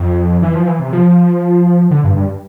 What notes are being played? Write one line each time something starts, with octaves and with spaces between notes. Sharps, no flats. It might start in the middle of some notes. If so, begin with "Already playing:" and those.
Already playing: F2
E3
F3
E3
C3
F3
D3
G2
G2